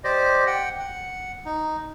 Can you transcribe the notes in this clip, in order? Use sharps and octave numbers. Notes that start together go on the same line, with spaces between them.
G4 C5 D5 D#5
F#5 G5
F#5
D#4